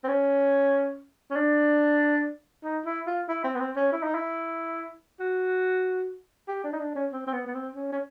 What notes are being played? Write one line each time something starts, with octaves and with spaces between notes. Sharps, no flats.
C4
C#4
C#4
D4
D#4
E4
F4
E4
C4
B3
C4
C#4
E4
D#4
E4
F#4
G4
D4
D#4
D4
C#4
C4
C4
B3
B3
C4
C#4
C#4